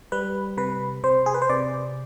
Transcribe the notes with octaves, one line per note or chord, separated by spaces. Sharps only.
G3 B4
C3 B4
C3 C5
G#4
B4
C5
C3 D5